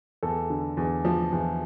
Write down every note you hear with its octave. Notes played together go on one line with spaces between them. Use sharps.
E2 A4
D3
E2
F3
E2